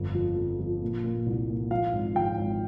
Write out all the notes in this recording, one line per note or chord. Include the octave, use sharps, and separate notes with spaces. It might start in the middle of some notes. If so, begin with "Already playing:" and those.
Already playing: G1 F2
F3
F3
F3
A#2
A#2
C2
A#2
F3 F5
G#1
F3 G5
G#1